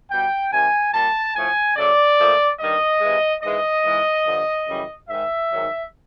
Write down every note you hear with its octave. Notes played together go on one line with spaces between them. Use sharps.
B2 G3 G5
C3 D#3 G3 G#5
A#2 G3 A5
A2 F3 A3 G#5
C#3 F#3 A3 D5
A#2 F3 A3
G2 D#3 G3 D#5
C3 E3 G#3
G#2 E3 G#3 D#5
G#2 E3 G#3
G2 D3 F3
F#2 C#3 E3 G3
G#2 D#3 G#3 E5
G#2 D#3 F#3